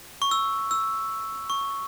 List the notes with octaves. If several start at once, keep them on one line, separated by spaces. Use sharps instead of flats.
C#6
E6
E6
C#6